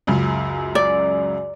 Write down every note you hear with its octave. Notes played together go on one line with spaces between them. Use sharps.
C#2 F#2 C#3
D5